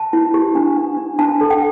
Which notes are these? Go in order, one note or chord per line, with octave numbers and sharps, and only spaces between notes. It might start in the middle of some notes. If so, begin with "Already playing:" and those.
Already playing: A5
E4
G4
D4
D4
D4
D4 A5
A4
G5